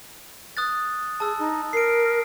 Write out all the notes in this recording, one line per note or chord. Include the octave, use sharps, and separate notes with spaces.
D#6 F#6 A6
G#4 A5 E6
D#4
A#4 C7 D7